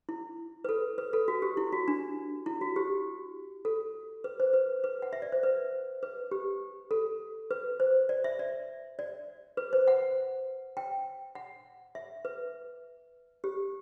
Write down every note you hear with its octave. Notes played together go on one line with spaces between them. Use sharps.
E4
B4
A4
B4
A4
F#4
G4
E4
F#4
D4
E4
F#4
G4
A4
B4
C5
B4
B4
F#5
E5
D5
C5
B4
B4
G4
A4
B4
C5
D5
E5
D5
D5
B4
C5
F#5
G5
F#5
E5
B4
G4